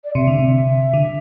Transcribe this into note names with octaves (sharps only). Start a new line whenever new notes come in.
D5
C3 E5
D3
C3
D3